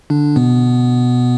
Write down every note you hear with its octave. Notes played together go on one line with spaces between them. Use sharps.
D3 D4
B2 B3